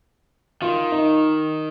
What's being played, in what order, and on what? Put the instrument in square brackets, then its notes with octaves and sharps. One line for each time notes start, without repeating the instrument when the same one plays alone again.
[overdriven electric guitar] D#3 [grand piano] F4
[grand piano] D#4